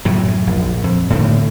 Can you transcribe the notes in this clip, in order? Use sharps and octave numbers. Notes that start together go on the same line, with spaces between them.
F#2 A2 C#3
A#1
F2
A2 D3 D#3